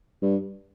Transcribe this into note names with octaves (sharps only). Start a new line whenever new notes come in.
G2